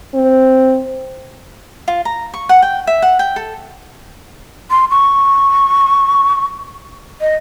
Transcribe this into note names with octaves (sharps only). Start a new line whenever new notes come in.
C4
F4
A#5
C#6
F#5
G5
E5
F#5
G5
A4
C6
C#6
D#5